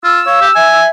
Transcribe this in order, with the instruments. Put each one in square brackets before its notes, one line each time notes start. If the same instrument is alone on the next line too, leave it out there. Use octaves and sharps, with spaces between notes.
[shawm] F4 [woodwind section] E6
[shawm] C#5 [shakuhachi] F5
[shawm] G4
[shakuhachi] E5 [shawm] G#5